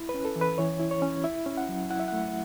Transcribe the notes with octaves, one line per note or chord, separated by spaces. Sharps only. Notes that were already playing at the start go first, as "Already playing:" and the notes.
Already playing: E4
B4
C#4
A4
E3
B4
E3 C#5
E4
C#5
C#4
E4 E5
C#4
F#5
F#3
E4 F#5
E5
A3 F#5